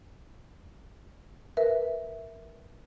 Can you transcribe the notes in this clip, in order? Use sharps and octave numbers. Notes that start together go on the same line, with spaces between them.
A#4 B4 E5